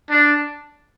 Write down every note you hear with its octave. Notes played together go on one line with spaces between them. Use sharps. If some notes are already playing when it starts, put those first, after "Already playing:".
D4